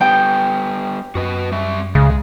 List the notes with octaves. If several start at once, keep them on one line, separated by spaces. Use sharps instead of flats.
G3 B3 G5
F#2 F#4 B4 D#5
G3 E5
C#2 C#3 G#3